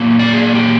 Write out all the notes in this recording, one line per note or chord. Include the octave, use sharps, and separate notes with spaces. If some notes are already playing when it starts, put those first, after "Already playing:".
Already playing: A#2 F#3 A#3
D5
G#4
G4